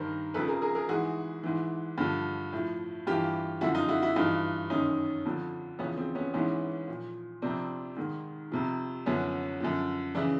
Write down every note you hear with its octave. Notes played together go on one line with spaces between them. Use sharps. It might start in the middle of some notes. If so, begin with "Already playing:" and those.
Already playing: G2 D#3 A#4 C5
F2 C#3 F3 A4 B4
G#4 A#4
G#4 A#4
G#4 A#4
G#2 E3 F#4 G#4
G#2 E3
G2 D3 F3
A2 F3
G2 E3 F4 G4
F#2 D3 F3 E4 F#4
D#4 F4
E4 F#4
E4 F#4
G2 E3 D#4 F4
F#2 D#3 C#4 D#4
F2 D3 F3
E2 C#3 F3 B3 C#4
C4
B3 C#4
G#2 E3 B3 C#4
A#2 F3
F2 C3 F3 C4 D4
G#2 D#3
F2 C3 F3
F#2 D3 F3 B3 C#4
F#2 D3 F3
C#3 E3 D4 E4